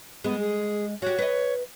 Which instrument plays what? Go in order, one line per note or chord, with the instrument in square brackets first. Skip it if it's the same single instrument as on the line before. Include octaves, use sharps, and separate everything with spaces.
[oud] G#3 [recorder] B3
[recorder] G#4
[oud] F#4 G4 [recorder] C#5
[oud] B4 D#5